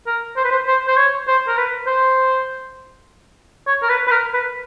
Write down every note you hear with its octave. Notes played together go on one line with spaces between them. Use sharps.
A#4
C5
B4
C5
C5
C5
C#5
C5
A#4
B4
C5
C#5
A#4
B4
B4
A#4
B4